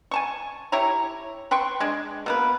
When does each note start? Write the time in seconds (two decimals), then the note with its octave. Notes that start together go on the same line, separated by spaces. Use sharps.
0.11 G#5 A5 C#6
0.72 E4 G4 C#5 A#5
1.51 B4 G5 C6 C#6
1.80 G#3 D4
2.26 B2 A#3 B4